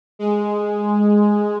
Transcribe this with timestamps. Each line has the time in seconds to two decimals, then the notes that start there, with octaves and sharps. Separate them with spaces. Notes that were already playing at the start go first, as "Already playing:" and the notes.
0.19 G#3